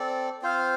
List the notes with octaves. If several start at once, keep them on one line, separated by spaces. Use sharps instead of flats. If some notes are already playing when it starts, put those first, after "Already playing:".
Already playing: C4 A4 D5
C4 F4 C5 F5